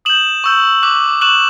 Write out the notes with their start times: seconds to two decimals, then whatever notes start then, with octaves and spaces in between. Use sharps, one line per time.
0.05 D#6 G6 E7 F#7
0.44 C#6 E6 G6
0.83 D6 F#6
1.21 C#6 F#6 E7 F#7